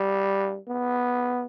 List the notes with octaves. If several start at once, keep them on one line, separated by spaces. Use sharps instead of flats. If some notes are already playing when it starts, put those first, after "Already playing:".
Already playing: G3
B3